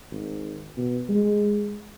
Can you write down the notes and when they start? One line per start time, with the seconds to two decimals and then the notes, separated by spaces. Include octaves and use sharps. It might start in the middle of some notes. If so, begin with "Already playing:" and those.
0.12 G#1
0.77 B2
1.09 G#3